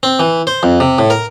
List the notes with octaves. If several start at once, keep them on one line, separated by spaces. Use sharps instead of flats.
C4
E3
C5
F2
C3
A2
A#4